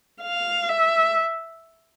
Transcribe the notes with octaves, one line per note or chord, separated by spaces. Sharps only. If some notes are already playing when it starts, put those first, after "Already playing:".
F5
E5